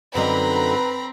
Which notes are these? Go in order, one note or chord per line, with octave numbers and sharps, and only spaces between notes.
F#2 D3 C4 D#4 B4 A#5 B5